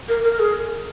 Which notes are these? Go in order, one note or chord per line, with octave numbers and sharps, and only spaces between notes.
A#4
A#4
G#4